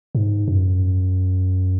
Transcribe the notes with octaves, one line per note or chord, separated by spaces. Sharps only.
G#2
F#2